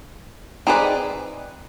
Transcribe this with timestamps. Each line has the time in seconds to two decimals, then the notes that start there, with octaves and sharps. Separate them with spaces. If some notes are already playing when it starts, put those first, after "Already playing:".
0.67 C4 D#4 G#4 B4 D5